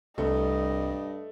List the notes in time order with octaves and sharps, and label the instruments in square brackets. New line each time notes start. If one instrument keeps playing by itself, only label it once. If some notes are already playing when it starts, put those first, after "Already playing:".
[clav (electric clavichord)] C2 [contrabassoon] G2 [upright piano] A3 [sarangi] D#5